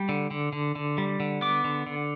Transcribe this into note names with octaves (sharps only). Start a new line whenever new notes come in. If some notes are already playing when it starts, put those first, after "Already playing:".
Already playing: G3
D3
D3
D3
D3
G3
D3
B3 D6
D3
D3